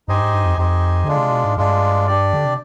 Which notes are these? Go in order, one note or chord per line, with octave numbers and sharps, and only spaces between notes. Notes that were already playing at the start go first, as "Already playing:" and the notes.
G2 D#4 G4 C5 D#5 G#5
G#2
G2
F2
F2 D#4 G4 C5 D#5 G#5
D3 G#3 D4 F4
C3
B2
G#2
G2 G#3 D4 F4
D4 G4 D5
D3
C3